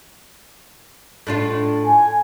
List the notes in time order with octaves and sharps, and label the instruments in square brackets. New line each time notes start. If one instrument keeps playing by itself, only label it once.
[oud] A2 D4 F4
[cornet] G#5